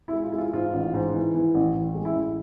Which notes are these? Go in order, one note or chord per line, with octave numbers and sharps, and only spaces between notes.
E4
G#3
F4
G#3 E4
F4
G#2 F4
A1
G#2
E3
E3
A1
A1
G#3
E4
A1